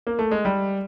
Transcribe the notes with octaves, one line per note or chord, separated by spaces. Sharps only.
A#3
A3
G#3
G3